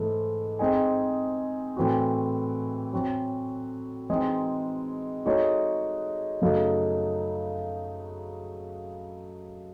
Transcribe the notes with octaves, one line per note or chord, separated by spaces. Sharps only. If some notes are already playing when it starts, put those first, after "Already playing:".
Already playing: G#2 E3 A3
G#3 C4 D#4 G#4
A2 E3 C4 F#4
F#3 C4 F#4
E3 G#3 C4 D#4
G#3 D#4 F#4 A4 C#5
F#2 C#3 F#3 A3 D#4